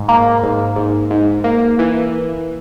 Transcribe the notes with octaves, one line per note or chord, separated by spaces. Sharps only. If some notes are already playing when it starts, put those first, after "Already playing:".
Already playing: G#2
A#3
G#2
G#2
G#2
A#3
E3